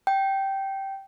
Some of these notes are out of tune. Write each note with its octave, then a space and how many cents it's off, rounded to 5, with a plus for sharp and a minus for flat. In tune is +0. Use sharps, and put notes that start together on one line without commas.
G5 -10